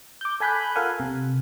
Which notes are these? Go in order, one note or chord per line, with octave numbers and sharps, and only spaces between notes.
D6 G6
A4 G#5 B5 F#6 G6
F4 A4 A#4 F5 F#5 G#5
C3